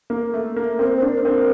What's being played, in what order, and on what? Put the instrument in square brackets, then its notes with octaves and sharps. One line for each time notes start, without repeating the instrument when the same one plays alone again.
[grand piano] A#3
A3
A#3
[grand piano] C4 [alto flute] A#4
[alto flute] C5
[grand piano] D4
[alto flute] A#4
[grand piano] C4
[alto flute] A#4